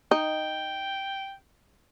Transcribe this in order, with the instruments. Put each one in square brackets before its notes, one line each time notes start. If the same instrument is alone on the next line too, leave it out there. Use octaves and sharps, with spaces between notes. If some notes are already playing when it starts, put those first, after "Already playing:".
[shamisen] D#4 [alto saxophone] G5